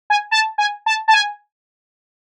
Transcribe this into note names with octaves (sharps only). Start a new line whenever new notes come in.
G#5
A5
G#5
A5
A5
G#5